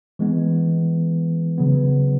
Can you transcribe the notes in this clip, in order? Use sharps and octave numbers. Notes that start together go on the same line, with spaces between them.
E3 G#3 B3
C#3 F#3 B3